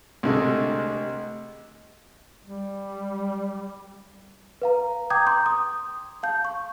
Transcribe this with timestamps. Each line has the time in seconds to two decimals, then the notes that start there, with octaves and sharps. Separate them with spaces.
0.23 C2 D3 G#3 A3 G4 D#5
2.45 G3
4.62 B4 F5 A#5
5.10 G5 A#5 D6 D#6 G6 G#6
5.26 A#5 C6 D6 G6
5.46 D#6
6.23 F5 A5 G6
6.45 C#6